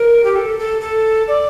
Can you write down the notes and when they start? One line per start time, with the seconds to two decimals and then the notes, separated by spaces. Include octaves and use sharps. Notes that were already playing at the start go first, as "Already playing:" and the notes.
Already playing: A#4
0.24 G4
0.36 A4
0.59 A4
0.81 A4
1.28 D5